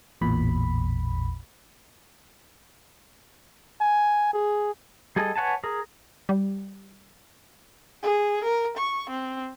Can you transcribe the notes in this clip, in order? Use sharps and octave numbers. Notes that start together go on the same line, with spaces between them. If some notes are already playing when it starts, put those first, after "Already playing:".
A1 E2 A#2 B5
G#5
G#4
G3 G#4 A4 D#5
B4 C#5 F#5 G#5 A5
G#4 A#4
G3
G#4
A#4
C#6
C4